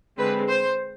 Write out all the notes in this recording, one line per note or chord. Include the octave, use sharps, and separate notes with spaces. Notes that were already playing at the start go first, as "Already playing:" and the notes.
D3 G#3 C4 B4
C5